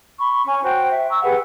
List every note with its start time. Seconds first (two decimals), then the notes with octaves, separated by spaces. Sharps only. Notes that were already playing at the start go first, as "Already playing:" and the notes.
0.19 B5 C#6
0.45 C#4 G#5 C#6
0.63 F#4 C5 G5
0.89 E5
1.10 A#5 C#6 E6
1.22 G4 G#4 B4 F#5